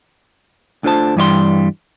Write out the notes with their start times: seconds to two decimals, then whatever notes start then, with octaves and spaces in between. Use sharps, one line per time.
0.83 D2 D3 F4 C5 A5
1.17 G2 E3 G3 C#5 C6